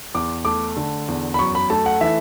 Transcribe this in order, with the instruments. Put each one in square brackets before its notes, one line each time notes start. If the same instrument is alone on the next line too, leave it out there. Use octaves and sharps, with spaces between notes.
[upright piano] E2 D6
A3 D6
D3
E2
B5
F#2 C#6
B5
A3 A5
F#5
E3 E5